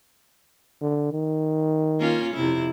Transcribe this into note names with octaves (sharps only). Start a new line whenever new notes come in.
D3
D#3
A#3 C#4 F4
F2 C3 E4